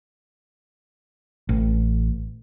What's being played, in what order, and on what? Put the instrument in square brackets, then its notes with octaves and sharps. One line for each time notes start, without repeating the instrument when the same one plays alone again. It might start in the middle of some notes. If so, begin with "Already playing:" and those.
[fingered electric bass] A1